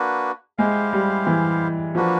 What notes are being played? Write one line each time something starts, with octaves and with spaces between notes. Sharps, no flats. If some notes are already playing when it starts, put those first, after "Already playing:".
Already playing: A#3 D4 F#4 B4
G#3 E4 G4 C5 F5
G3
E3
F3 A#3 D4 F#4 B4